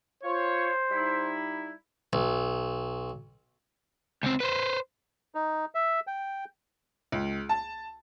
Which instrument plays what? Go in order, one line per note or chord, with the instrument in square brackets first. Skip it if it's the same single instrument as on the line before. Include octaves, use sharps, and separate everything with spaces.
[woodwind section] F4 C#5 [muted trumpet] C5
[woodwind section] G3 D#4 E4
[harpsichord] B1
[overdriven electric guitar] C#2 C4
B4 C5
[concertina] D#4
E5
G5
[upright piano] C#2
A5